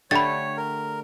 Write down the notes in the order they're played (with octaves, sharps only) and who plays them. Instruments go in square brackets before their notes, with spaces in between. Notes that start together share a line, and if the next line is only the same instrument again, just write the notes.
[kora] D3 A3 G4 [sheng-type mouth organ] C#5 [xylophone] B5 A6
[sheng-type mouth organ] A#4